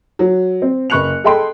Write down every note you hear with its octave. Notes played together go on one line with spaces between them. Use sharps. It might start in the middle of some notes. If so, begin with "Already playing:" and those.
F#3
C4
F#1 B4 C#6 F#6 C#7 F7
G#4 A4 D#5 G5 B5 C6